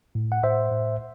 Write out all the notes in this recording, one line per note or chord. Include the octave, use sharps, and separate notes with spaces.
A2
F#5
A2 C5 E5
A2